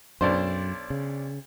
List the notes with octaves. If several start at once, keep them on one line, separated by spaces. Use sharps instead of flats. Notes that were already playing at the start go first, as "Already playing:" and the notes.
B1 F#2 D4 C5
C#3